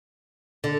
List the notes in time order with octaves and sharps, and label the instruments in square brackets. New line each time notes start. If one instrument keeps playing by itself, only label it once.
[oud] D3